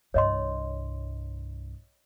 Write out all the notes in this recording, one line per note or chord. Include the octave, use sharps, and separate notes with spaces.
C2 G2 C#5 D#5 C6